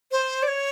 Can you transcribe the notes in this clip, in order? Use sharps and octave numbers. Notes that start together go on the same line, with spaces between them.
C5
D5
C#5